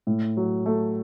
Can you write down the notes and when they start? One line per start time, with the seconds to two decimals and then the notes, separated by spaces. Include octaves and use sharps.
0.07 A2
0.37 F#3
0.66 A3